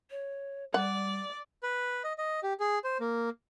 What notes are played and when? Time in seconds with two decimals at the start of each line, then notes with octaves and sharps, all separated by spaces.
0.10 C#5
0.74 G3 D5 F#5
1.63 B4
2.04 D#5
2.18 D#5
2.43 G4
2.60 G#4
2.84 C5
3.00 A#3